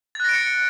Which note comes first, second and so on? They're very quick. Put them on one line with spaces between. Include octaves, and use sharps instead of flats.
A6 F#6 A#6 D7 C#7